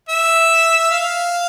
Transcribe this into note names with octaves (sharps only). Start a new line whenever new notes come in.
E5
F5